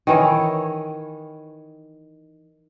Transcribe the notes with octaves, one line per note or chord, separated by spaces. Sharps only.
D#3 E3 C#5